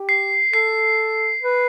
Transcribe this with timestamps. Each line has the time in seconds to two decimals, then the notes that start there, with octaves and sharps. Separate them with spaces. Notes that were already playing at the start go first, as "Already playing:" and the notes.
Already playing: G4
0.09 C7
0.53 A4 C7
1.43 B4